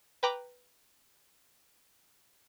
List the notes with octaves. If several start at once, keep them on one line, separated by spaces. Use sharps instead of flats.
B4 G5 A#5 B5 D6